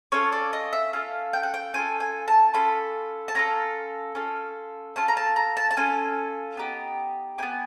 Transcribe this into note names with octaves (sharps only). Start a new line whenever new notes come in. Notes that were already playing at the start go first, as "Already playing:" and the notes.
C#4 F4 A4 C#5
D5
D#5
E5
C#4 F4 A4 F5
G5
F#5
G5
C#4 F4 A4 G#5
G#5
A5
C#4 F4 A4 B5
A5
C#4 F4 A4 A#5
C#4 F4 A4
C#4 F4 A4 A5
A#5
A5
A#5
A5
A5
C#4 F4 A4 G#5
B3 D#4 G4
B3 D#4 G4 G#5